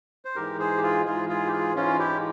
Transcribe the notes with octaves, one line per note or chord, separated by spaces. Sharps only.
C5
G#2 E3 G#3 G4 A#4
G#4 C5
G4
F4 G#4
G#2 E3 G#3 F4 G#4
F4 G#4
G4
F4 G#4
G#2 E3 G#3 C#4 F4
E4 G4